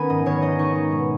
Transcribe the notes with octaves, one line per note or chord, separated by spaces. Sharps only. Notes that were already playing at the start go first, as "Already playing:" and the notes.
Already playing: D#3 B3 C#4 D#4 G#5 B5
G#2 D#5
D#3 C#5
D#4 D#5
D#4 C#6
G#3
B2